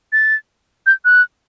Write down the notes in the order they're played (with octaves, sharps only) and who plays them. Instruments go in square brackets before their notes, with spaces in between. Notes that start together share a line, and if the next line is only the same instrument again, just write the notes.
[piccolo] A6
G6
F#6